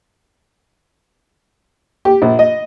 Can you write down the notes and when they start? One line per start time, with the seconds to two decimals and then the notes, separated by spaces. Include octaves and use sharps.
2.05 G4
2.22 A#1
2.39 D#5